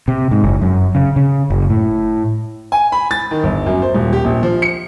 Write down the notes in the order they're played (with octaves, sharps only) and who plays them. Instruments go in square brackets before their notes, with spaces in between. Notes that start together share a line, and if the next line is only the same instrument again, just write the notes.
[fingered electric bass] C3
G#2
F#1
F#2
C#3
C#3
F#1
A2
[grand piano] G#5
B5
A6
D#3
G1
F#2
C5
D#1
G4
A#1
F3
C#7